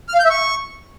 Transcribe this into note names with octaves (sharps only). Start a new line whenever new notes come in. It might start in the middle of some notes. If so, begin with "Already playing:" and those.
F6
F5
G6
E5
C#6